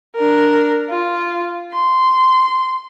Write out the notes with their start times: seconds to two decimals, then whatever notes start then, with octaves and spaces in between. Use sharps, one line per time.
0.16 D4 A#4
0.90 F4
1.73 C6